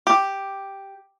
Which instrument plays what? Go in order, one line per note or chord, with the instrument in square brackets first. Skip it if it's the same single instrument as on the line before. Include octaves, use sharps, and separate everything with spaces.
[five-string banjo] G4